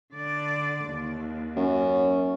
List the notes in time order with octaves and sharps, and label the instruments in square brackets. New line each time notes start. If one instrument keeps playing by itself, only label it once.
[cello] D3 D5
D#2
[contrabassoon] F#2 [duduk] C#4